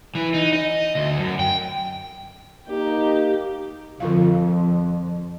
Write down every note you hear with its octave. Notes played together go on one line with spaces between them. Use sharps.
E3
D#4
D#5
D2
F#2
G5
A#3 D#4 G4
F2 D3 F4 F5